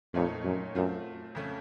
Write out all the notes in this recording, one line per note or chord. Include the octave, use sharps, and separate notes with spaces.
F2 A#2 A3 D#4 A#4 C#5
F#2
F#2 A3 C4 F4 C5
F2 C#3 A3 C#4